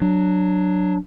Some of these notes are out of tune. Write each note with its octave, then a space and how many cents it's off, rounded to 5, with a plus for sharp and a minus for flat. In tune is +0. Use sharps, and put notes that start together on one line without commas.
F#3 +0 D4 +10